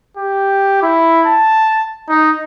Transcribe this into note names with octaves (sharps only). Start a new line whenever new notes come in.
G4
E4
A5
D#4